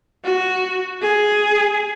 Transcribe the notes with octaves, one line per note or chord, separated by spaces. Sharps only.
F#4
G#4